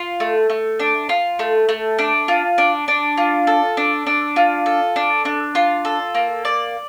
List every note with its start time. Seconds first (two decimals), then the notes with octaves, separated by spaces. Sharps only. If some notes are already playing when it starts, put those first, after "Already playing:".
Already playing: F4
0.20 A3
0.50 A3
0.80 D4
1.09 F4
1.39 A3
1.69 A3
1.99 D4
2.28 F4
2.58 D4
2.88 D4
3.17 F4
3.47 A4
3.77 D4
4.07 D4
4.36 F4
4.66 A4
4.96 D4
5.25 D4
5.55 F4
5.85 A4
6.15 A#3
6.45 D5